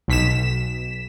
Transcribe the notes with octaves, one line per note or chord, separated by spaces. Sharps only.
B1 B6 E7